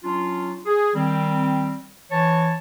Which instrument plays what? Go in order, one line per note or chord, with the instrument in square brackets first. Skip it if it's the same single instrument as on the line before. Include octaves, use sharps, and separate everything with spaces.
[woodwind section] F#3 C#4 D4 F4
G#4
D#3 G3 C4
E3 C#5 A5